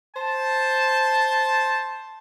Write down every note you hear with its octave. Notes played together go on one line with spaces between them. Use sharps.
C5 A5